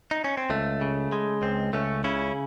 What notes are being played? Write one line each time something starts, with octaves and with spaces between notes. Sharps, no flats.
D#4
C#4
C4
C#2 A3
C#3
G#3
C#2 C4
C#2 A3 C#4
C#3 C#4 E4